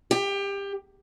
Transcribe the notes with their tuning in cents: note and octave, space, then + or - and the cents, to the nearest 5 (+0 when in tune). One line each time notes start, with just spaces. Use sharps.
G4 +25